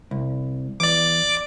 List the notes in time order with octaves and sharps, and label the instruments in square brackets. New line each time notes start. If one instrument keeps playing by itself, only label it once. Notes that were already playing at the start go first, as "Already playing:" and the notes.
[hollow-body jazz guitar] C2
[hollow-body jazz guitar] E2 [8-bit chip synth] D5 D6